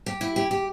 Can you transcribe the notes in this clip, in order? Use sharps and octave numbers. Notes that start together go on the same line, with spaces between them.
G4
E4
G4
G4